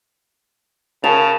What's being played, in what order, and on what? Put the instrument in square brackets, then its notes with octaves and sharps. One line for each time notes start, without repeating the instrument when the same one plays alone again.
[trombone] C#3 [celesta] A#4 F7 [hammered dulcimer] A5